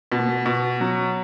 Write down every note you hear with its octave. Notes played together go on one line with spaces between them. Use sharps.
B2 B3
A#3
B3
B2
F#3 B3